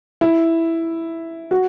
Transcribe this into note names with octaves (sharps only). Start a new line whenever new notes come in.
E4
F#4